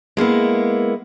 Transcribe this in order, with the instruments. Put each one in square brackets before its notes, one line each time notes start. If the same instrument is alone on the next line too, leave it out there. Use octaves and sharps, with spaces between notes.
[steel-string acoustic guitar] G#3 A#3 B3 E4